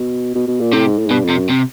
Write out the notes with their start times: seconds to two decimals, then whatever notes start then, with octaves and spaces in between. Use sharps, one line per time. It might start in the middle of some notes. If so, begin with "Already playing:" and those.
Already playing: B2
0.35 B2
0.47 B2
0.60 A#2
0.73 A2 C3
0.86 G#2
0.98 A2
1.06 G#2
1.11 G2 B2
1.24 F2
1.30 C3
1.37 F#2
1.50 C3